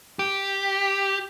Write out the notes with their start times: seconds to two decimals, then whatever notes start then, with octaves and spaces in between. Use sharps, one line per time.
0.19 G4